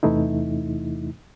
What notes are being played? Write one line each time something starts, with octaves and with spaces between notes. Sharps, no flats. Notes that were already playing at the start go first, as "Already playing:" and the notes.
E2 C3 E3 A3 D#4 E4